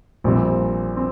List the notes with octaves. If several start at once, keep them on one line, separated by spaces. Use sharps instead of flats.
A#1 A#2 G3 C4
C4